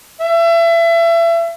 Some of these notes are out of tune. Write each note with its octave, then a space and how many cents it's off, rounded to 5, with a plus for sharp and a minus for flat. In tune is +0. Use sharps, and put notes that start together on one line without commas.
E5 +30